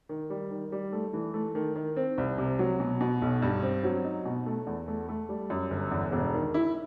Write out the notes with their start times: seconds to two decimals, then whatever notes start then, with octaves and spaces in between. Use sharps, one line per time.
0.09 D#3
0.30 G3
0.51 D#3
0.72 G3
0.93 A3
1.13 E3
1.34 A3
1.55 D#3
1.76 D#3
1.96 C4
2.18 C2
2.38 C3
2.59 F#3
2.80 B2
3.01 B2
3.22 B1
3.42 G2
3.63 C4
3.84 F#3
4.04 D#4
4.25 B2
4.46 A3
4.67 E2
4.88 A3
5.09 A3
5.29 G3
5.50 F#2
5.71 G1
5.91 E2
6.12 E1
6.33 D#3
6.54 E4